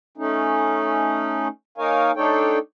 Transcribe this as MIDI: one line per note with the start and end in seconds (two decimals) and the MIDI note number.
0.18 1.48 57
0.18 1.48 61
0.18 1.48 63
1.78 2.11 58
1.78 2.11 63
1.78 2.11 70
1.78 2.11 73
1.78 2.11 77
1.78 2.11 80
2.16 2.59 57
2.16 2.59 62
2.16 2.59 63
2.16 2.59 69
2.16 2.59 73
2.16 2.59 79